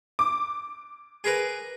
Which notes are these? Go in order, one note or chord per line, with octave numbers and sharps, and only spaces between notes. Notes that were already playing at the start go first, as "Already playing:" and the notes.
D6
G#4 A#4 B4